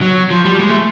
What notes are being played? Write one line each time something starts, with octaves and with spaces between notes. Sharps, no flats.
F#3
F3
G3
G#3
A3